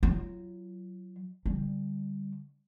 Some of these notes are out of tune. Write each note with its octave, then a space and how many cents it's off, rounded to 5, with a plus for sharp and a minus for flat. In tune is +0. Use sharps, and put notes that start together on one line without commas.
F#3 +0 F4 -30
D3 -10 G3 +0